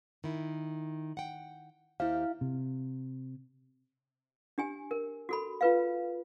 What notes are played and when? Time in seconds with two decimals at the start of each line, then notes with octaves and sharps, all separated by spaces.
0.24 D#3 E4
1.17 F#5 G5
2.00 D#2 E4 G4 C5 F5
2.41 C3
4.58 D4 G4 G#5
4.91 A#4
5.29 F#4 A4 B5
5.61 F4 B4 F5